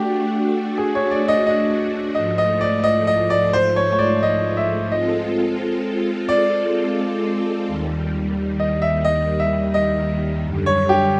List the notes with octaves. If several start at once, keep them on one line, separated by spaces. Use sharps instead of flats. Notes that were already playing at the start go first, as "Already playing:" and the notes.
Already playing: A3 D4 F#4 G4
G#4
C#5
D5
D#5
D#5
G#2 F3 A3 D#5
D#5
D5
D#5
D#5
D5
C5
C#5
C#5
D5
D#5
E5
G#3 C4 F4 A4 D#5
D5
D#2 D#3 G3
D#5
E5
D#5
E5
D#5
F#2 D3 G3
C#5
G4